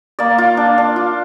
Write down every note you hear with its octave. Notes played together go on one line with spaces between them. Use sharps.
A#3 D5
F4
D4
D4
F4